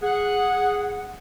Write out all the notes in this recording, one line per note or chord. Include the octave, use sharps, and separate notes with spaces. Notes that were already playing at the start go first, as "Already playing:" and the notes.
G#4 F#5